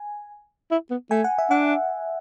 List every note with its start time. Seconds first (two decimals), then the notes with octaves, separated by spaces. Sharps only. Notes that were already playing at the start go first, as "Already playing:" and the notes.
Already playing: G#5
0.71 E4
0.91 B3
1.11 A3 G#5
1.24 F#5
1.38 E5
1.50 D4 F#5